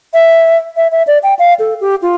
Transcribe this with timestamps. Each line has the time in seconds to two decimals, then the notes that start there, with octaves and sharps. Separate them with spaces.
0.14 E5
0.77 E5
0.92 E5
1.07 D5
1.23 G5
1.39 F5
1.59 A4
1.81 G4
2.02 F4